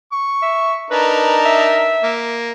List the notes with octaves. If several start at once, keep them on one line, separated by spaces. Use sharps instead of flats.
C#6
E5
D4 D#4 A#4 B4
E5
A#3